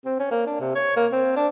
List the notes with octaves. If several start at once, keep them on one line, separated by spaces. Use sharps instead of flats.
C4
C#4
A#3
D4
C3
C#5
A#3
C4
D4